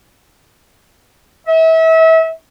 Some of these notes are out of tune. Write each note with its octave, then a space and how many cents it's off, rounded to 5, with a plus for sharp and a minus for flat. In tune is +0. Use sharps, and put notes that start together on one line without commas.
E5 -30